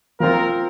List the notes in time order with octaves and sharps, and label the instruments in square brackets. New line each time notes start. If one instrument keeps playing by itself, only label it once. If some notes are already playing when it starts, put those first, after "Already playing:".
[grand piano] F3 C4 F4 [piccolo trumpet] A#4